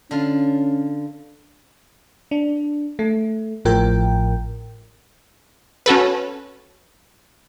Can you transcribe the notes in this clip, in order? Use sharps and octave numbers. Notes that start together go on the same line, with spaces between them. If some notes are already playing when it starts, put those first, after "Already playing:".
D3 C#4 F4
D4
A3
A1 A2 F3 A#4 G5
C#4 F#4 A4 B4